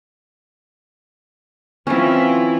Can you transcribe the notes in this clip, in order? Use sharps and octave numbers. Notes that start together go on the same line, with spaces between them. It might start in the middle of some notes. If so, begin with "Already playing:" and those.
E3 C4 C#4 E4 F4